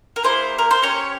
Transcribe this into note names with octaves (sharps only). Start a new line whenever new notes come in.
A#4
A#3 E4 G#4 C5
A#4
C5
C#4 G4 C#5